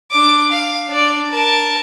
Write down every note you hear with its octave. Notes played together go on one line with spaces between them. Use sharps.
D4 D6
F5
D4 D5
A#4 A5